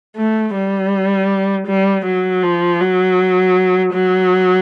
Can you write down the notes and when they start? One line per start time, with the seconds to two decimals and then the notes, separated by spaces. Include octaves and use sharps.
0.17 A3
0.55 G3
1.67 G3
2.06 F#3
2.43 F3
2.81 F#3
3.94 F#3